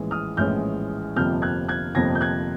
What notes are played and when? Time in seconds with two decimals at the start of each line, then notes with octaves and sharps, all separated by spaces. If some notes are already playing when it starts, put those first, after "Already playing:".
Already playing: A#1 A2 E3 G#3 C#4
0.11 D#6 F6
0.37 A#1 A2 E3 G#3 C#4 F6 G6
1.16 G1 F2 C3 F3 A#3 F6 G6
1.42 F#6 G#6
1.69 F#6 G#6
1.95 G1 F2 C3 F3 A#3 G#6 A#6
2.15 G6
2.21 F#6 G#6